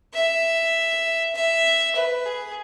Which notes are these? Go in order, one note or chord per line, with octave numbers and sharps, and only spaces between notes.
E5
E5
B4
G#4